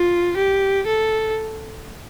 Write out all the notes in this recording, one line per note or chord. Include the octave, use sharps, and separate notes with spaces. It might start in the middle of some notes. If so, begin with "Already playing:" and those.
Already playing: F4
G4
A4